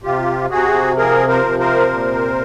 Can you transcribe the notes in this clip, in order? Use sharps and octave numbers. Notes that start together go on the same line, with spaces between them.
C3 F4 G4
C3 F#4 G#4
F3 G#4 A#4
A#4 C5
C3
A#4 C5
A#2